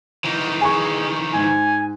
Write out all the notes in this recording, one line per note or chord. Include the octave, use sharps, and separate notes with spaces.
D#3 E3
G#4 G#5 C#6
G#2 G#5